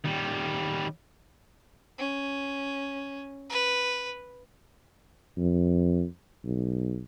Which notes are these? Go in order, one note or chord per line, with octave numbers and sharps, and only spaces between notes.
D#3 G3
C#4
B4
F2
B1